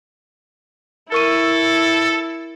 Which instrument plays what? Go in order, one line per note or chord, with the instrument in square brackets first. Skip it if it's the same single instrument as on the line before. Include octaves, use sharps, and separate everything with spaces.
[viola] E4 [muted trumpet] A4 [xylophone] A#4 C#6 D#7